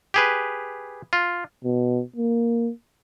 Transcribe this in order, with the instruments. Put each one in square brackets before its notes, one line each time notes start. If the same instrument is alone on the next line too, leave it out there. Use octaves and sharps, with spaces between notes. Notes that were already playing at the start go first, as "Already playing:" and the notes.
[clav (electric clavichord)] G4 G#4 B4
F4
[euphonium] B2
A#3